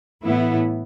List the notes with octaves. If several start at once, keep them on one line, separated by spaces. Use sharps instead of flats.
A2 E3 B3 E4